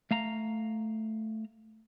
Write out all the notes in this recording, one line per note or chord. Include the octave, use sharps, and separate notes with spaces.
A3 F5 A#5